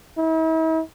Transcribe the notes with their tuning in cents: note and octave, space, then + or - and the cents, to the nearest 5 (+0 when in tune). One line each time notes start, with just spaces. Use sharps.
E4 -45